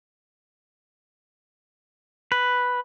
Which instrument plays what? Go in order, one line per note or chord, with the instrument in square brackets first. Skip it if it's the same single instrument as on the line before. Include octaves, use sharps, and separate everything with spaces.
[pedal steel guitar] B4